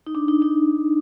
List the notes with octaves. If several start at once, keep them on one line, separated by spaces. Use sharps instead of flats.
D#4
D4
D#4
D#4